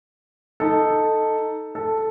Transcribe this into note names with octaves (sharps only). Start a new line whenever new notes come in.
D#4 A4
A4